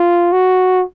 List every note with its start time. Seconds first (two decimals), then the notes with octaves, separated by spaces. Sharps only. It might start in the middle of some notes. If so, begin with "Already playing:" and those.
Already playing: F4
0.33 F#4